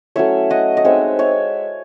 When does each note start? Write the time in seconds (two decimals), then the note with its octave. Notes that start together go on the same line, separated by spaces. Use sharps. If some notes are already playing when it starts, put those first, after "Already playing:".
0.16 F#3 A3 C#4 E4 C#5 E5
0.50 D#5 F#5
0.77 D#5
0.85 G#3 C4 D#4 C#5 E5
1.19 C#5 E5